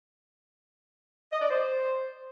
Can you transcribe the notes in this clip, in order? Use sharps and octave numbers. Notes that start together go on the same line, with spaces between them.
D#5
D5
C5